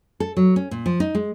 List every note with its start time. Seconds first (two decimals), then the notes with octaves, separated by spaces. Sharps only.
0.20 A4
0.37 F#3
0.56 C#4
0.71 A#2
0.86 F3
1.00 D#4
1.15 G#3